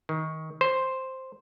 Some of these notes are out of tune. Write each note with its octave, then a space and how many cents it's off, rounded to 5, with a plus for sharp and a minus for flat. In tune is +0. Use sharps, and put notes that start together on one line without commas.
D#3 +25
C5 +5